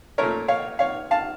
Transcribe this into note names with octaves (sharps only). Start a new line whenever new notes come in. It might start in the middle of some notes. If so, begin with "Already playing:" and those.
A#2 A3 C#4 A#4 C#5
C#5 F5
C#5 F5
F5 A5